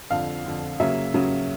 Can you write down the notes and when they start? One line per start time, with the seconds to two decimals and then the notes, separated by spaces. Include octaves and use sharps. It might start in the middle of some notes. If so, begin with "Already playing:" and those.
0.10 F2 D3 F3 F5
0.45 F2 D3 F3
0.80 C#3 F#3 A#3 C#4 E5
1.14 C#3 F#3 A#3 C#4